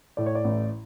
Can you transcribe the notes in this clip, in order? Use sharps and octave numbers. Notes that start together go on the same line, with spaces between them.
A2 D5
C#5
D5
A1